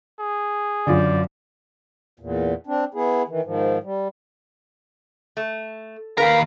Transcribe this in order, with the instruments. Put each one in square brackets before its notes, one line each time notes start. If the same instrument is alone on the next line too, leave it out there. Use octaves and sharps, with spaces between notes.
[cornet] G#4
[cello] F#2 [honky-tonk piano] D3 F4 [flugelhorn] D5
[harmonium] E2 A#2
C4 D4
B3 E4 G#4
D#3 E3
G#2 D#3 F3
G3
[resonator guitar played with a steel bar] A3
[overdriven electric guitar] D#2 A#5 [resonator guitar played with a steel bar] A#4 B4 G5 [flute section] F5 B5